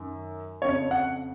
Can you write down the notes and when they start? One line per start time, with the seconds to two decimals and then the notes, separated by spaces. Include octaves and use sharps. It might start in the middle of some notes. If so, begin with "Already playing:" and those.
Already playing: F#2 D#3
0.62 F2 C#3 C#5
0.91 F#5